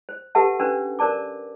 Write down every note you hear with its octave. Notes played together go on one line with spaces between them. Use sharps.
C5
G4 A4 B4 E5 F#5 A5
C#4 D4 B4 C5
A#4 C5 D5 A5 D6